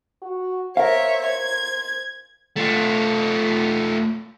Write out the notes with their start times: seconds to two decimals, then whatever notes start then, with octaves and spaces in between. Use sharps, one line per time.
0.22 F#4
0.77 A#4 C5 C#5 E5 F5
1.27 G#6
2.56 A3 F4